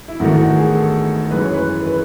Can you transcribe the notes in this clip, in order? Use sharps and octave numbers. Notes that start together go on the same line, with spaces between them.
E4
A1 G#2 D#3 A3 F#4
F#4
G#4
A4
F#2 E3 G#3 B4
C#5
B4
B4